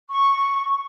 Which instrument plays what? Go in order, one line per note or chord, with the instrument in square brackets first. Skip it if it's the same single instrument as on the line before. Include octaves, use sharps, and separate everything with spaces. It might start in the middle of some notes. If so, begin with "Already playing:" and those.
[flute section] C#6